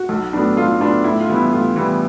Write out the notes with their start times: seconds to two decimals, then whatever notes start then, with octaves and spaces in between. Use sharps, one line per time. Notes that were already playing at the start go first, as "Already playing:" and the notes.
Already playing: F#4
0.09 B1
0.33 A2 F#3 B3 D4
0.57 B1 F4
0.80 A2 F#3 B3 D4 F4
1.04 A2 E4
1.20 F4
1.28 E3 G3 B3
1.36 E4
1.52 A2 F4
1.76 E3 G3 B3